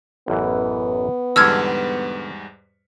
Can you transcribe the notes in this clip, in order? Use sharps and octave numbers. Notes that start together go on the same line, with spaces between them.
A1 F#2 E3 B3
E2 G#2 D3 G3 E6 F6 G#6